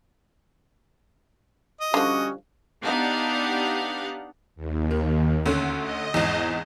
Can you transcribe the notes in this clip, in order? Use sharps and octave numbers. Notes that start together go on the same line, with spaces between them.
D#5
D3 F3 G3 C#4 F#4
B3 D4 D#4 G4 F5 F#5
D#2
D#3
D2 D3 C#4
D#5
G#1 E2